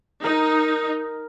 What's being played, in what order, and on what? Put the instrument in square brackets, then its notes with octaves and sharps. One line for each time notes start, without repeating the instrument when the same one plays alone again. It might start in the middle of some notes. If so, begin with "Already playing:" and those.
[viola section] D#4 [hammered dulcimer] A#4